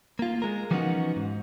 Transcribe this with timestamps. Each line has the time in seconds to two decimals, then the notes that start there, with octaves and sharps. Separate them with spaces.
0.19 A#3 F4
0.42 G#3 A#4
0.71 E3 F3 B3 C#4 D#4 F#4
1.16 G#2